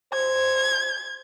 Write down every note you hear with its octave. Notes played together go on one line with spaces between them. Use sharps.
C5 G#6